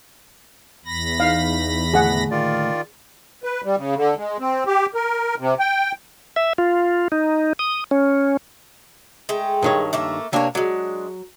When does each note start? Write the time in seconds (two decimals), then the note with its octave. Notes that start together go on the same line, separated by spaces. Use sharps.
0.86 E2 B5 A#6
1.20 D#4 F5
1.94 D#2 A2 D3 G#4 F#5
2.31 D#3 F4 D5
3.44 B4
3.64 G3
3.77 C#3
3.96 D3
4.17 G#3
4.40 C4
4.67 G4
4.94 A#4
5.38 C3
5.59 G5
6.36 E5
6.58 F4
7.12 D#4
7.59 D#6
7.91 C#4
9.29 G#3 A3 G5
9.63 G2 D#3 C#5
9.93 A3 A#3 E5
10.33 C3 A#3 D4 C#5 G#5
10.55 F#3 G#3 D4